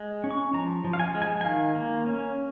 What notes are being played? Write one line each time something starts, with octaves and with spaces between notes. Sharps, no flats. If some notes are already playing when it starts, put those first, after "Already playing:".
Already playing: G#3
C#4
C#6
F3 A#5
F3
F5
G#5
G#3
G#5
G#5
D#3 F5
A#3
C#4